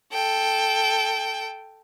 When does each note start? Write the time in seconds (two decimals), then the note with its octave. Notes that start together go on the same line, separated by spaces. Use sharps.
0.13 A4 G5